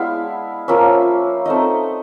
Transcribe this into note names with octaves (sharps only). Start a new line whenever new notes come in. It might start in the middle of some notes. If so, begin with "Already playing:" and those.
Already playing: G#3 B3 D4 E4 F5
F3 A#3 C#4 E5
A3 C4 D#4 D#5